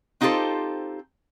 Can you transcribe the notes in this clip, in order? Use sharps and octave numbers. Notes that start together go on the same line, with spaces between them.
C4 D#4 F4 G4 A4 C5